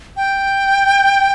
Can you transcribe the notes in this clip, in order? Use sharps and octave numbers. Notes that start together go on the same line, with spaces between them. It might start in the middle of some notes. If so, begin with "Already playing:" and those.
G5